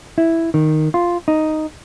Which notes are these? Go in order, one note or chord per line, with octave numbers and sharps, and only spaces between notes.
E4
D#3
F4
D#4